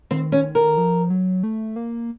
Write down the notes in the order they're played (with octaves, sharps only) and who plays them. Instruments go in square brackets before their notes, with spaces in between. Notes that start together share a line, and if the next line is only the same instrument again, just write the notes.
[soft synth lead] D#3 [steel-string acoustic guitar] C4
[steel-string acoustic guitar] C#4
A#4
[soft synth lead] F3
F#3
A3
A#3